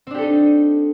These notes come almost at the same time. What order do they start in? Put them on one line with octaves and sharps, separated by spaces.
C4 D4 G4 A4 D#4